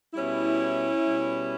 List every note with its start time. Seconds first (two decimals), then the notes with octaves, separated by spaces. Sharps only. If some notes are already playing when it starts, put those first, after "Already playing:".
0.14 B2 G3 C#4 E4
1.07 B2 G3